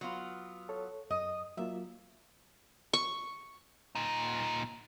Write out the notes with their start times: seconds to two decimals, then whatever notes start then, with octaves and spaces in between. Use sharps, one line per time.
0.01 F#3 B3 F4
0.69 A4 C#5
1.10 F#2 D#5
1.57 F#3 A#3 F4 E5
2.93 C#6
3.95 A#2 D#4